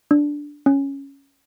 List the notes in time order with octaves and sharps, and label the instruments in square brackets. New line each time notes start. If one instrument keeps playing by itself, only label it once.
[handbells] D4
C#4